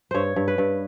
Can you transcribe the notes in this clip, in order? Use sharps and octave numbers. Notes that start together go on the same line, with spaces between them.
G2 C5 C#5
G2
B4
G2